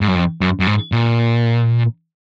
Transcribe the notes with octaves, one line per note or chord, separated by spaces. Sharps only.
G#2
F#2
F2
F#2
F#2
G#2
A#2